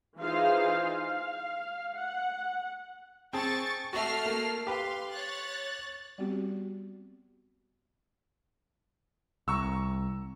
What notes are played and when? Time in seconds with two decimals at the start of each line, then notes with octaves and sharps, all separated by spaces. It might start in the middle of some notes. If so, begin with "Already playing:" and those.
0.19 E3 D#4 F4 G#4 C5 F5
0.85 F5
1.98 F#5
3.33 C4 G#4 A5 C#6 A6
3.93 A3 F#4 E5 F6 C7
4.26 A#3
4.67 G4 B4 F5 C6
5.10 C#5 F#6 A6
6.18 G3 B3 C4 F#4 G4
9.48 C2 A#5 C#6 E6